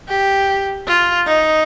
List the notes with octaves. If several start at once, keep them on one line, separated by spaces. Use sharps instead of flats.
G4
F4
D#4